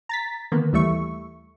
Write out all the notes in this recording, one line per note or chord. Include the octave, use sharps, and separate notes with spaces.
A#5 A6 B6
D3 D#3 A#3 B3
D#2 E3 G3 A3 E5 C#6